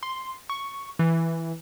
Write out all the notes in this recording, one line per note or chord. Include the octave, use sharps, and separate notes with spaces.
C6
C#6
E3